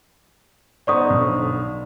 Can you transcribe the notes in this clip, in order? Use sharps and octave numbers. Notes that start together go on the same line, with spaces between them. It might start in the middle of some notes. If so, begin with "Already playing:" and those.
B3 D#4 C5 D5 C#6 D#6
B1 D3